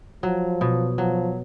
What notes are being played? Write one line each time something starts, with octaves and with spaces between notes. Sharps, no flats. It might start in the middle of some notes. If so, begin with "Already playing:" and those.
F3 F#3
B2
F3 F#3